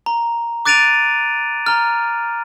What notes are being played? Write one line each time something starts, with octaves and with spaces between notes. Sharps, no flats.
A#5
D6 F#6 A6 D7 D#7 F7
A#5 F6